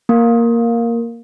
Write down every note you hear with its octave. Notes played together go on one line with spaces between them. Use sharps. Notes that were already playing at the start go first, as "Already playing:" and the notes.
A#3